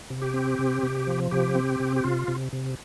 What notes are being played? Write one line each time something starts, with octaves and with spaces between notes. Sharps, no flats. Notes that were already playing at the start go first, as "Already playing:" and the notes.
C3
G4
C4
C3
C3
F3
C3 G4
C4
C3
G4
C3 F4
C3
C3